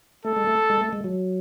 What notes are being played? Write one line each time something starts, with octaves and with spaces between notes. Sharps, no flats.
A3 A4
G#3
A3
G#3
A3
G#3
F#3